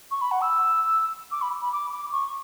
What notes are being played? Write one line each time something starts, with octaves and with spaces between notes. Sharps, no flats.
C#6
B5
F#5
E6
D6
B5
B5
D6
D6
C#6